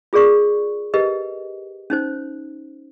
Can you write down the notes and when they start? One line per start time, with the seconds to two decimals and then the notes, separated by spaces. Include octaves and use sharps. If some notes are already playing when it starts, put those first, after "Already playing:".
0.13 F4 G#4 A#4 D5 C#6
0.94 G4 A#4 B4 D#5
1.90 C#4 D#4 C5